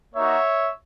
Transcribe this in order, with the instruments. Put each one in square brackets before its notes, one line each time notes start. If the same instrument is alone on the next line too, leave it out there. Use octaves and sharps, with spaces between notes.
[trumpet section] A#3 D#4 F#4 C#5 E5